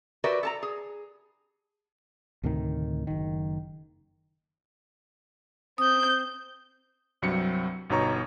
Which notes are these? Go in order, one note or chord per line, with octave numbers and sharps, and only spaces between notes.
F#4 G4 A#4 B4 D5 E5
A4 A5 A#5
G#4
D2 A2 C3 D#3
F#1 D#3
C4 D#6 G6
C2 G2 F#3 C4 C#7
G1 B2 D#4 C#5 A#5 C#6